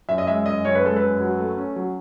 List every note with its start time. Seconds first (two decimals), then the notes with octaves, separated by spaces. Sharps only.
0.09 F#2 E5
0.18 D#5
0.27 G#3 E5
0.46 F#2 D#5
0.65 F#2 C#5
0.75 B4
0.84 G#3 A4
0.96 B4
1.02 F#2
1.20 F#3
1.39 A3
1.57 C#4
1.76 F#3